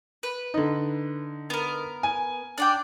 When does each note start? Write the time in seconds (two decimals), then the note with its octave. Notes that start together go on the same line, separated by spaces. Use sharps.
0.23 B4
0.54 D3 D#4
1.50 B3 A#4
2.03 G#5
2.58 D4 D5 G5